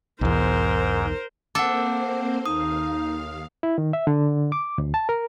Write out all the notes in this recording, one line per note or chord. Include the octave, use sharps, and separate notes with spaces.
B1 E2 G#2 A#4 C5
A#3 C4 A4 C5 F#5 D6
D#2 D#4 F5 D#6
E4
D#3
E5
D3
D6
D2
A5
A#4